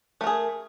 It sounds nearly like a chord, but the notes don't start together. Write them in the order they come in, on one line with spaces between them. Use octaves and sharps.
A3 A#4 G#4